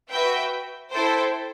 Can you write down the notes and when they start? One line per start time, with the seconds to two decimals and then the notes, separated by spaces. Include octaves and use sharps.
0.11 F#4 B4 E5 G5
0.92 E4 A4 C5 G5